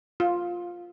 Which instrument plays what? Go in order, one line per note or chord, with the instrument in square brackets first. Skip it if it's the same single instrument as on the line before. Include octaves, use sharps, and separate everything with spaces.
[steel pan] F4